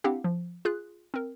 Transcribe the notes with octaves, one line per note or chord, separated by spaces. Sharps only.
C4 D4 E4 G4 F5 F#5
F3
F4 G#4 F#6
C4 A#4